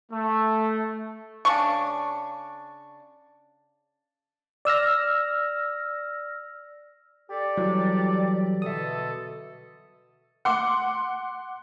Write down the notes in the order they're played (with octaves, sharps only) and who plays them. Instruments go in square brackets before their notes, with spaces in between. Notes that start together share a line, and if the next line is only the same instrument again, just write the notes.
[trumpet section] A3
[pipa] C#3 D4 C#6
[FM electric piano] D5 E6 F6 A#6
[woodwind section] G4 A4 D5
[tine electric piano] E3 F#3 G3
[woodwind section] B2 D3 A4 [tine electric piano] E5 D#6
[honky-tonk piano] F#5 C6 D6